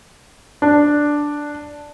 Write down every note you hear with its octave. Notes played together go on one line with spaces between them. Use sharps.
D4